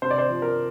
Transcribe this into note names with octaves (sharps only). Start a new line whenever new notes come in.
C3 C5
D5
C5
F3
A#4